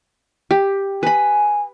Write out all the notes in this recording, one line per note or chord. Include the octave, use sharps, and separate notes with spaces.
G4
B4 G#5 B5